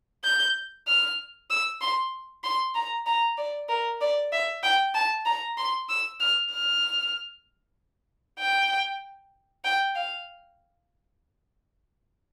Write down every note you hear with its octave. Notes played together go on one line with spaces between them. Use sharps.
G6
F6
E6
C6
C6
A#5
A#5
D5
A#4
D5
E5
G5
A5
A#5
C6
E6
F6
F6
G5
G5
F5